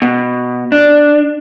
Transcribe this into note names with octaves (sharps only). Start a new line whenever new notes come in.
B2
D4